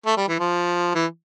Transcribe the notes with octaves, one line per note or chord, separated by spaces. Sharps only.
A3
G3
E3
F3
E3